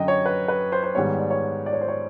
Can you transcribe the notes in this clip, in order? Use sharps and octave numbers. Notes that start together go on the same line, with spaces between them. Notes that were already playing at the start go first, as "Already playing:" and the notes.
Already playing: F#2 D3 F#3 D#5 G5
C#5
B4
B4
C5
C5
G#2 D#3 G3 B3 C#5
D5
C#5
D5
C#5
C5
C#5